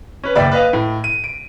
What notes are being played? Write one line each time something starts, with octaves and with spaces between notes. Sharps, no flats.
C#4 B4
F#1 D5 E5 G5 B5
B4 D#5 F5
A2
D#7
D7